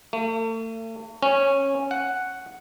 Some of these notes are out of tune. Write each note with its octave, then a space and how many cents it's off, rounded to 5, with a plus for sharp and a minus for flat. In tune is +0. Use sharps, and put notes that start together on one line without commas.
A3 +40
C#4 -10
F#5 +5